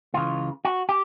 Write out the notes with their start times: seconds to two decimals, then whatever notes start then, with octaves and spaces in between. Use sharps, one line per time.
0.14 C#2 C#3 E3 F4
0.65 F#4
0.89 G4